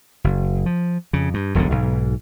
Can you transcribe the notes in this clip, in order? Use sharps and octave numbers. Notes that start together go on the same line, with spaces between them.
F#1
F3
F2 C#3
G2
E1 B1 F2 D3
B1 G#2